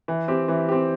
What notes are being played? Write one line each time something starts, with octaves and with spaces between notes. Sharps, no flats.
E3
C4 G4
E3
C4 G4